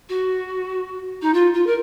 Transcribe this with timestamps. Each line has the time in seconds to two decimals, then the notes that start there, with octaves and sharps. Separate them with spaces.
0.09 F#4
1.22 D#4
1.33 F4
1.54 F4
1.66 A#4